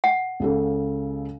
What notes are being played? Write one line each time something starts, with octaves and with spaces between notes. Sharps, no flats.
F#5
C#2 C#3 A4